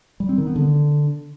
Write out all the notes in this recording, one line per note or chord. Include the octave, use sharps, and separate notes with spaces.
G3
C4
D#3
B3
D3